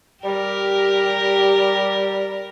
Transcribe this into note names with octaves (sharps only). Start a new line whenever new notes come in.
G3 G4 A#4